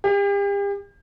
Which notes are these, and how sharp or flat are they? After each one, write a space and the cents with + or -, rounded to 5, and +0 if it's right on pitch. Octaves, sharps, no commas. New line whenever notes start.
G4 +40